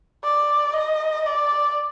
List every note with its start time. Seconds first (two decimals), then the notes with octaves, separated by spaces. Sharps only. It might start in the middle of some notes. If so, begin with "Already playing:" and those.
0.24 D5
0.74 D#5
1.25 D5